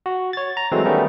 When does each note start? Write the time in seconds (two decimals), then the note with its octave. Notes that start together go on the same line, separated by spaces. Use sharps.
0.06 F#4
0.33 C#5 A6
0.57 A#5
0.72 E3 F#3 G#3 A3 C4
0.85 D#3 G3 A3 B3 C#4 D#4